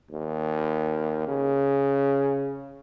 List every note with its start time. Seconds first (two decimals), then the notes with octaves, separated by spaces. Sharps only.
0.11 D#2
1.28 C#3